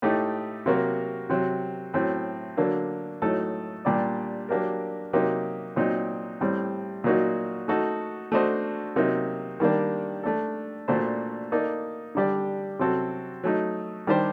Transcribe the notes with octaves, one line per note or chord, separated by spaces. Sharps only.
A2 A3 D#4 G4
C3 F#3 A#3 F#4 A#4
C3 F#3 C4
A2 F#3 C4
D3 F#3 A#3 D4
A2 F#3 A3 D#4 A4
A#2 G3 D4 G4 D5
F#3 A#3 D4 G4 A#4
C3 F#3 A#3 D#4 G4
A#2 F#3 C4 D#4
A2 G3 C4
A#2 F#3 A#3 D#4 F#4
A3 D#4 F#4 A4
A3 D4 F#4 C5 D#5
C3 F#3 A#3 D#4
D#3 G3 A#3 D4
A3 D4 A4
A#2 A3 D4 F#4 C5
A#3 D#4 A4 D5
D3 G3 D4 G4 D5
C3 F#3 C4 F#4 A4
F#3 A3 D#4
D#3 G3 D4 G4 C5